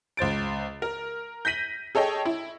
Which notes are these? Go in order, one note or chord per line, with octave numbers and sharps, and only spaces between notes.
C#2 C5 A6 D7
A#4
G6 A#6 B6 D#7 F#7
G#4 A4 C#5 D#5 G5
E4